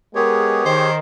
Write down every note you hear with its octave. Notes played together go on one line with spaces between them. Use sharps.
G#3 B3 G4 G#4 A#4 C#5
D#3 C5